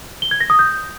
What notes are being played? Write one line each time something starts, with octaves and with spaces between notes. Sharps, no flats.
G7
G#6
A#6
D#6
G6